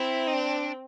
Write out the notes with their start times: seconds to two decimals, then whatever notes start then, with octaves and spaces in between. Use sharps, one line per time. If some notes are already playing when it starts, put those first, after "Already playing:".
Already playing: C4 E4
0.27 D#4
0.34 D4